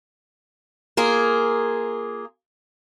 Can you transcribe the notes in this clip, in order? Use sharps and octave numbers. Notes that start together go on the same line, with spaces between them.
A#3 F4 G#4